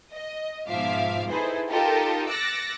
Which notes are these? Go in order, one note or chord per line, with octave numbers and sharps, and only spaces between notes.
D#5
G#2 B2 F3 E5 F5 D6
D#4 E4 G#4 A4 B4 C5
D#4 F4 G4 A4 A#4
D6 E6 F#6 A6 A#6 C#7